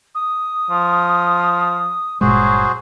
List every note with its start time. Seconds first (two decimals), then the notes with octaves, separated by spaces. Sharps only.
0.15 D#6
0.71 F3
2.21 G1 A#2 F#3 G#3 F#4 G#4 C5